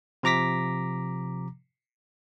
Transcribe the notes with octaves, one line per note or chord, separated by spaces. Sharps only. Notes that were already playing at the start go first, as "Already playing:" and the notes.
C3 F3 A#5 D6 A#6 B6